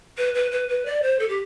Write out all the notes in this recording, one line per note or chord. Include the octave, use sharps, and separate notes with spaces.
B4
B4
B4
B4
D5
C5
A4
G4